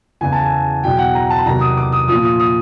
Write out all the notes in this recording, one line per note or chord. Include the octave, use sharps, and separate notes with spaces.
E2 C#3 E3 G#5
A5
G#5
E2 B2 F#3 G5
F#5
A#5
A5
B5
E2 C3 D#3 F#3 A#5
D#6
D6
D#6
A#2 F3 D#6
D#6
D#6